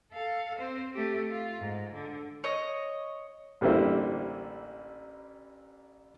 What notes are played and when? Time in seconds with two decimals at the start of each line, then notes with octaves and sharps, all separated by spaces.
0.13 A4 F5
0.59 C4 C5
0.94 A3 G4
1.30 F4
1.59 G#2
1.93 D3
2.44 C#5 D#5
3.61 A1 D3 G3 A#3 E4 C5